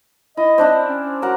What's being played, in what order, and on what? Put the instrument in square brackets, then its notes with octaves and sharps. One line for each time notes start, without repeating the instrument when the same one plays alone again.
[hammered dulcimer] E4 [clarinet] D#5
[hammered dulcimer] C4 D4 E4
[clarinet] C#4
[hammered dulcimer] F#3 A#4 F#5